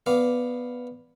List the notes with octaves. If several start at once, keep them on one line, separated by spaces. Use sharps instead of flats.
B3 D5 F5